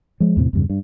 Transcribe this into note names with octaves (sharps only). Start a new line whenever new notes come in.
F3 G#3
E2 A2 C3
E2 G2 C#3
G2